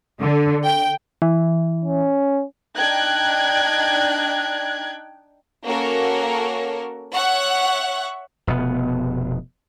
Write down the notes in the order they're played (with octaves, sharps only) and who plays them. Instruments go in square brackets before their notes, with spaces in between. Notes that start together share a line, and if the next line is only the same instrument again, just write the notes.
[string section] D3
G5
[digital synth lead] E3
[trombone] C#4
[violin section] D4 D#4 G5 F#6 G#6
A#3 C#4 F#4 A4 A#4
C#5 E5 F#5 C#6 F#6
[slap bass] F1 B2 B3